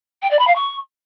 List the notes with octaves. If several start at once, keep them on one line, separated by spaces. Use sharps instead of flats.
G5
D5
B5
F5
C#6